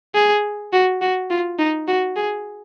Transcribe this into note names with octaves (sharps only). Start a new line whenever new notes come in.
G#4
F#4
F#4
F4
D#4
F#4
G#4